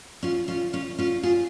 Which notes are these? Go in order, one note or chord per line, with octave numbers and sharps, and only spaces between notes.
C#4 F4
C#4 F4
C#4 F4
C#4 F4
F4 G#4